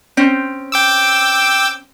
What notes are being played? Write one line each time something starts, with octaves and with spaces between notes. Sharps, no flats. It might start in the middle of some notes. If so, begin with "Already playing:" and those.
C4 C#4
G5 D6 E6